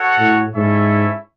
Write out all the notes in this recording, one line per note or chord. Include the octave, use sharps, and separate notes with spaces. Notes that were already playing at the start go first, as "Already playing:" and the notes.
Already playing: F#4 A4 C#5 F#5
A2
G#2 C#4 E4 A4 C#5 E5